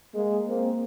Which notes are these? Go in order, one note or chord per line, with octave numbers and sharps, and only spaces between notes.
G#3 A#3
A#3 C4